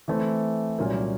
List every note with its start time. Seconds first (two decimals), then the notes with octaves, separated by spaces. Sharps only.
0.08 E3 A3 C4
0.78 C2 A#2 F#3 A#3 C#4